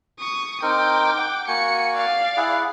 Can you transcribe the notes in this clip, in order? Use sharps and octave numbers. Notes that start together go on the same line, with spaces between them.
C#6 D#6
C4 D#4 A#4 G5 D6
F#5
A#3 F#4 G#5 C#7
D5 F5
E4 G#4 F#5